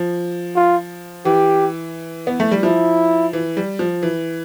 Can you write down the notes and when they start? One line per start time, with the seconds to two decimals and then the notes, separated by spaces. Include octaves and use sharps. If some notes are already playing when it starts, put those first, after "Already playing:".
Already playing: F3
0.56 F4
1.25 E3 G4
2.27 B3
2.40 A3
2.51 G3
2.63 F3 E4
3.33 E3
3.57 G3
3.79 F3
4.03 E3